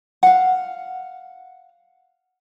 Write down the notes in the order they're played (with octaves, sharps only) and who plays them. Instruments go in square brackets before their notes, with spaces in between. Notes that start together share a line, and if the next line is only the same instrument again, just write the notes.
[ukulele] F5 F#5